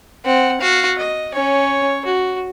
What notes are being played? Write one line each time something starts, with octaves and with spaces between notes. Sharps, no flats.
C4 F#5
F#4 F5
D#5
C#4 C#5
F#4